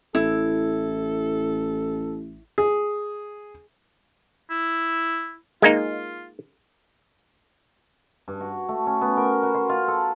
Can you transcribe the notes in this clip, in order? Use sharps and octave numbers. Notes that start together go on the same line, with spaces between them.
A1 E4 A4
G#4
E4
G#3 A#3 D#4 F4
G2
F#4
A3
C#4
B3
A#4
F#4
C6
F4
A4